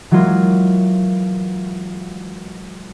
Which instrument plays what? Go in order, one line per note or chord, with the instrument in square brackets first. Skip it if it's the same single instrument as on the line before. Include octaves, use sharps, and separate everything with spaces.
[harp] E3 F#3 G#3 A#3 F4